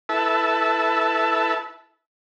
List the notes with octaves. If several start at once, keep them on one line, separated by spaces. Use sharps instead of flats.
E4 A4 B4 E5 A5